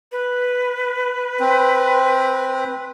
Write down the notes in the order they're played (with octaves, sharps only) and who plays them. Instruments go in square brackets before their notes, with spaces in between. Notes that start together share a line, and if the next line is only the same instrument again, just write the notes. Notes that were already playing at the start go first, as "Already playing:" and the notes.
[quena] B4
[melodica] C4